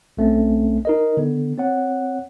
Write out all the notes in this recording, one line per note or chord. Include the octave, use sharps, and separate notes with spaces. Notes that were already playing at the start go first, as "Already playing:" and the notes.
B1 A3 C4 C#4
D#4 A#4 D#5
D3 B3
C4 C#5 F#5